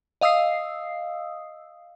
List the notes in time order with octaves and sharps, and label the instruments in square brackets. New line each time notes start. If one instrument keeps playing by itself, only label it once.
[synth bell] D#5 F5 D#6 E6 C7